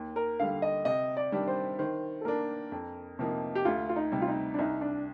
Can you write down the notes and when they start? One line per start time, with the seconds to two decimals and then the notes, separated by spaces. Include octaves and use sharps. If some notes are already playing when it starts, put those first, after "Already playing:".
Already playing: D#2
0.16 A#4
0.40 D3 G3 F5
0.62 D#5
0.85 C3 D#5
1.17 D5
1.32 D#3 G3 D4 G4
1.47 C5
1.79 D#3 C5
2.21 A4
2.25 A#3 D4 A#4
2.72 F2
3.19 C3 F3 A#3 D#4
3.55 G4
3.65 D2 F4
3.89 F4
3.96 D#4
4.12 C3 G3
4.22 F4
4.28 D#4
4.54 D4
4.58 C2 D#4
4.81 D4